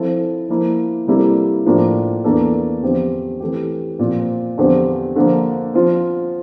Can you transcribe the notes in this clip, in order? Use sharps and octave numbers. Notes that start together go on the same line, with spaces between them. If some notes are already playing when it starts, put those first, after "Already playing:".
Already playing: F3 C4 E4 A4
F3 A#3 E4
C3 G3 A#3 E4 A4
A2 F3 A#3 D4 F4
E2 E3 A#3 D4 A4
E2 D3 F3 C4 G4
E3 A3 C4 G4
A#2 F3 C4 F4
E2 D3 F3 C4 G4
D3 F3 A#3
F3 C4 F4